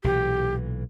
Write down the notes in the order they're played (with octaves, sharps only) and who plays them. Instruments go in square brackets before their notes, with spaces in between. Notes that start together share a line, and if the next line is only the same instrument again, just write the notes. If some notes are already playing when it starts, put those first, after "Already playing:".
[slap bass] B1 A#2 E3 [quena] G4